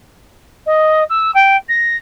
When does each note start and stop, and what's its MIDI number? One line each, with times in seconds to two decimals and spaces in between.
0.66 1.03 75
1.09 1.30 88
1.34 1.56 79
1.68 1.96 94